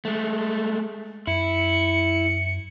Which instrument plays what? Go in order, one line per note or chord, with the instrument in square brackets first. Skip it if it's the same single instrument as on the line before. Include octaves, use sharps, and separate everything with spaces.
[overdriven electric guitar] G#3 A3
[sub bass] F#2 [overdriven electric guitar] E4 [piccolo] C#7